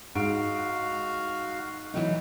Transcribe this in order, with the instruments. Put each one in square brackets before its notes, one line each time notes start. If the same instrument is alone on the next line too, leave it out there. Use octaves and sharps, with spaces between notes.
[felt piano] G#2 D7 [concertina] F#4 F5
[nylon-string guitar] E3 F#3 D#4